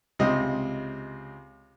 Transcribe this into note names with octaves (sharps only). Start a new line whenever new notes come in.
C#2 C3 D#5